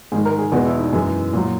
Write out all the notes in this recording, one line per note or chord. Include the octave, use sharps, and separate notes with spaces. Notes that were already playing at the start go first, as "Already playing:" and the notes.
G#2 D#3 G#3 G#4
A#4
G#4
E2 B2 G#3 F#4
E4
D#4
F#2 E3 G#3 G#4
A#2 F#3